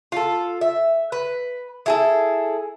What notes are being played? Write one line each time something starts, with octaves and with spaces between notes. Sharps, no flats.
F4 A4
E5
B4
E4 G#4 A4